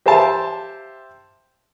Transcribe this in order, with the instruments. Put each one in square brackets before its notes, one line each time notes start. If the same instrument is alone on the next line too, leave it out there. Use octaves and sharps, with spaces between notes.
[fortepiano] G4 C5 E5 F5 A5 C6